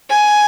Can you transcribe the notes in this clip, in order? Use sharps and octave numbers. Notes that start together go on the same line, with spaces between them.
G#5